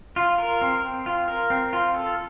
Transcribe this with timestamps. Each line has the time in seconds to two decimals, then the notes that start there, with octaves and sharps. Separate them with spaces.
0.16 F4
0.38 A#4
0.61 C4
0.83 C4
1.06 F4
1.28 A#4
1.50 C4
1.73 F4
1.94 A4